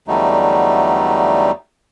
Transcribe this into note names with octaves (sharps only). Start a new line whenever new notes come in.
E2 D3 F#3 G3 A3 D#4